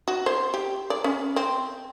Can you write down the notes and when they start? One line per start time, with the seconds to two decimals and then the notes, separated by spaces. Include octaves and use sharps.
0.08 F#4
0.26 C5
0.54 G4
0.90 D5
1.04 C#4
1.36 C4